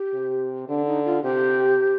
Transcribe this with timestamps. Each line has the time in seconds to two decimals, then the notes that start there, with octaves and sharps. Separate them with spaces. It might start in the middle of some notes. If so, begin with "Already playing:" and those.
Already playing: G4
0.13 C3
0.69 D3 D4
0.87 D#4
1.05 F4
1.23 C3 G4